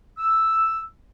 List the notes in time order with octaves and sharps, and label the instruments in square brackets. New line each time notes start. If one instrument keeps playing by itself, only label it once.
[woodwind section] E6